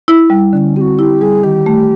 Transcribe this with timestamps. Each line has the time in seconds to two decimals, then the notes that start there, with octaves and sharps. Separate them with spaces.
0.08 E4
0.30 G3
0.53 D3 C#4 D4
0.76 C4 F#4 G4
0.99 E4 G4
1.21 G3 G#4
1.43 D#3 G4
1.66 A3